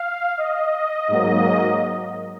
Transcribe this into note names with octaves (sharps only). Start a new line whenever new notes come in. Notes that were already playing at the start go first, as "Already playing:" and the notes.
Already playing: F5
D#5
G#2 F#3 A#3